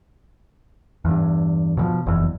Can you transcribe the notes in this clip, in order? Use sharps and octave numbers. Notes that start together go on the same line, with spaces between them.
E2 G2
B2 D#3 F3
F#1 E2